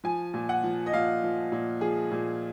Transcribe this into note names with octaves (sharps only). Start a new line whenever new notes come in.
F3 G#5
A#2
F#5
F3
D#5
A#2 F5
F3
A#2
F3 G#4
A#2